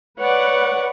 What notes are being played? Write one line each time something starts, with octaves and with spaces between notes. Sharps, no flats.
B4 C#5 D5 F#5